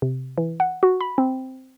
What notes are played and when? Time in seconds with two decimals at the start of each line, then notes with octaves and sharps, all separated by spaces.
0.02 C3
0.38 E3
0.60 F#5
0.83 F#4
1.01 B5
1.18 C4